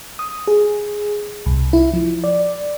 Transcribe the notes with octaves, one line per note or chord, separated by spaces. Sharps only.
D#6
G#4
C2
E4
F3
D5